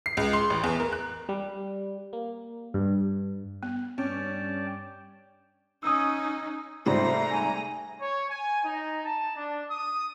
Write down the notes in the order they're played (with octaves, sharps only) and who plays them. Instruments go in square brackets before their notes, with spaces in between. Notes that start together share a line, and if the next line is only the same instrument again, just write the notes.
[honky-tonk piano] C7
C#2
C6
A1
E2
A#4
F#6
[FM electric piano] G3
A#3
G2
[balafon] B3
[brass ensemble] G2 [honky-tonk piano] C#4 [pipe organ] D5 G5 A5
[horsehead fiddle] C#4 D#4 [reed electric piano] D#6 E6
[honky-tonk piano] G#2 C3 G3 [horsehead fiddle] A3 A#5 [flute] C5
[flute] G#5
[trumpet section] C#5
G#5
D#4
A5
D4
D#6